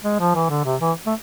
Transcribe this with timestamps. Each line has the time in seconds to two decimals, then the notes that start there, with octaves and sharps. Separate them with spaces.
0.04 G#3
0.19 F3
0.35 E3
0.49 D3
0.65 C3
0.81 E3
1.06 A3